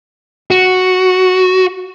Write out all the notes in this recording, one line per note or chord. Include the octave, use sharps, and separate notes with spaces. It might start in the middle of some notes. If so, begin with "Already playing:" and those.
F#4